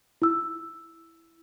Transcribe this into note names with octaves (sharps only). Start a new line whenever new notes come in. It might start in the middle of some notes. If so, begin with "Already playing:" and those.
E4 E6